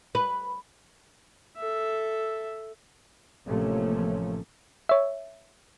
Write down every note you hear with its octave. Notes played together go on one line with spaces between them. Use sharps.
B4
A4 E5
A1 C3 F3 A3 A#3 C#4
C#5 E5